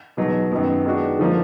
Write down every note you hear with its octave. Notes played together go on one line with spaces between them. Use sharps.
E2 B2 F#3 B3 D#4
F#2 D#3 F#3 B3
D#3 G#3 B3 D4 F#4
D3 F3 A#3 D#4